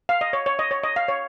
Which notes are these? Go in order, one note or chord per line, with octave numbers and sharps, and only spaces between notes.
F5
D#5
C#5
C#5
D#5
C#5
D#5
F5
C#5